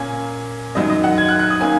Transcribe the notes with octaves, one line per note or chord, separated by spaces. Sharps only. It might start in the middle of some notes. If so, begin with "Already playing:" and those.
Already playing: A#2 A#3 C#4 G#5
F#2 D#3 F#3 D#5
D#5
F#5
G#6
F#6
F#6
D#6
D#3 A#3 C#4 G#5